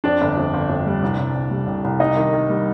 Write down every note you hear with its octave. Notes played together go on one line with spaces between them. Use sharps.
F2 D4 D5
G1
F2
G1
F2
G3
C2
C2
C2
G3
C2
C2
G3 D#4 D#5
D#3
D#3
G3